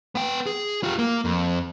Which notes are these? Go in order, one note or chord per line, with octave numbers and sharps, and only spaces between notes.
B3 G5
G#4
F4 G4
A#3
F2